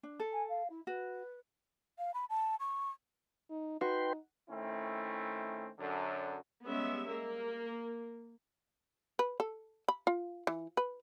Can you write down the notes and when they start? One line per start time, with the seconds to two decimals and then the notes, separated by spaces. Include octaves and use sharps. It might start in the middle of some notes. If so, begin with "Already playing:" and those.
0.03 D4
0.20 A4
0.32 G#5
0.48 F5
0.69 E4
0.87 F#4 B4
1.98 F5
2.14 B5
2.30 A5
2.60 C#6
3.50 D#4
3.81 D#4 F#4 B4 G5 C6
4.50 D#3 A3 C4 C#4 E4
5.78 F#2 D3
6.64 G3 G#3 B3 C#4 E5
7.09 A#3
9.19 B4
9.40 A4
9.88 B5
10.07 F4
10.47 E3
10.77 B4